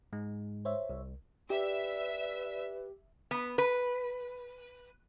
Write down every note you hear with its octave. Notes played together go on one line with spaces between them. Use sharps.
G#2 G#3
C5 C#5 E5
C2
G4 B4 D5 E5
B3
B4